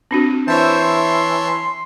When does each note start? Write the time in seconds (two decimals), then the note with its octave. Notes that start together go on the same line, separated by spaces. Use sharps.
0.11 C4 D4 F#4
0.48 E3 C5 C#5 E5 A5
0.79 C6